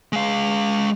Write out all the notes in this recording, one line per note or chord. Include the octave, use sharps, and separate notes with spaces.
G#3 F5